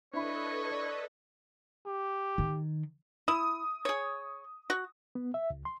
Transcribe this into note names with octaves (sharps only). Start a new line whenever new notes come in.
D4 E4 A4 B4 C#5 D#5 B5
D5
G4
D#3
E4 D#6
G#4 C#5
F#4
B3
E5
C#2
C6